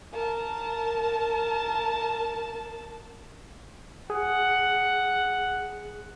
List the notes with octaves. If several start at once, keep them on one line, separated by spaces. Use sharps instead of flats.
A#4 A5
G#4 F#5